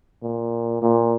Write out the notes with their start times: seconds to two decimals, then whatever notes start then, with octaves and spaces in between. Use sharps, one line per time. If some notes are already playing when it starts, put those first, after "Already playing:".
0.22 A#2
0.82 A#2